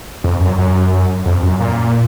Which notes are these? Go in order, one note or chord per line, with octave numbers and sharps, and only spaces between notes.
F2
F#2
F#2
F2
F#2
A#2